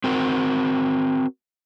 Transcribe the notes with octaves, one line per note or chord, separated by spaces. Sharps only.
C4 F#4 A#4